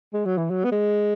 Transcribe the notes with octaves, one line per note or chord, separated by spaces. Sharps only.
G#3
F#3
E3
F#3
B3
G#3